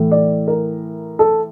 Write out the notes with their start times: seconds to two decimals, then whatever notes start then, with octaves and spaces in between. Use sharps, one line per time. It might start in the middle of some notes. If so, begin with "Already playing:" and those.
Already playing: A2 E3
0.11 D5
0.48 A#4
1.19 A4